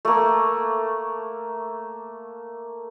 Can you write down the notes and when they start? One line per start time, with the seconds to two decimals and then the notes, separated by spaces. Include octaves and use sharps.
0.05 A3 A#3